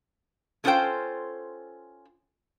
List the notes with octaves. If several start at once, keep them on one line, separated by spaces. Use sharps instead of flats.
A3 C#4 F4 A4 C5 G5